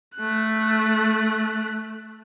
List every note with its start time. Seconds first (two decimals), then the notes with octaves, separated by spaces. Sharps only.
0.16 A3 F#6